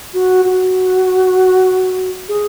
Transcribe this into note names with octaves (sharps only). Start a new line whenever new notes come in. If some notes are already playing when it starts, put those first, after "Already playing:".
F#4
F#4
G#4